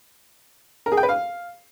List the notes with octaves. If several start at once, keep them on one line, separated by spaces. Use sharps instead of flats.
A#4
G#4
G5
B4
F5